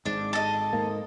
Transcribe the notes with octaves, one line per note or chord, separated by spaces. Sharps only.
G#1 G#2 D4
A4 D#5
G#2 A#3